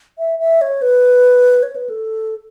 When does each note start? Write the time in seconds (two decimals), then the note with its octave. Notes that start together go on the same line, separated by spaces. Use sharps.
0.18 E5
0.39 E5
0.61 C#5
0.82 B4
1.63 C#5
1.76 B4
1.89 A4